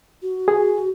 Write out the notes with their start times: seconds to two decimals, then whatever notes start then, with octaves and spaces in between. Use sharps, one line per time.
0.22 F#4
0.48 G#4